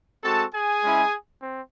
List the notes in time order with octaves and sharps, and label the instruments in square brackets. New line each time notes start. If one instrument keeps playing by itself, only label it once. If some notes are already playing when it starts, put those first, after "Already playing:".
[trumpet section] G#3 C4 F#4 A4 A5
G#4 G#5
G#3 C#4 E4
C4